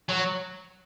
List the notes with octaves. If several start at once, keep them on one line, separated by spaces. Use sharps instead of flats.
F#3